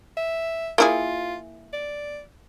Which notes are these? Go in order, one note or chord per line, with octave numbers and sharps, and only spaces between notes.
E5
A#3 E4 F4 G#4
D5